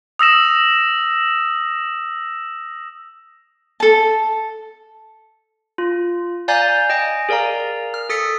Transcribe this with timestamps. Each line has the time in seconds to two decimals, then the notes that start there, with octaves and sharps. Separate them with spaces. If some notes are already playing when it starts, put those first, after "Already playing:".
0.19 D#6 E6 A#6 E7
3.80 A4 A5
5.78 F4
6.48 D5 F5 G#5 A#5 G6 A6
6.89 D#5 G5 G#5
7.29 G#4 A#4 D5 F5 A#5
7.94 F6
8.09 A4 D#6 A6 B6 C#7